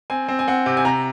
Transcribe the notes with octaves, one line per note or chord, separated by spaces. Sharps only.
C4 G#5
C4
G#5
C4 F#5
C3
G#5
C3 A#5